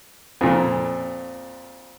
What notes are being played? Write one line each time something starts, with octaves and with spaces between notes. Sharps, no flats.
F2 A#2